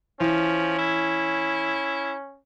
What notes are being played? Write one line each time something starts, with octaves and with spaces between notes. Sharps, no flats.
E3 F3 C#4
E4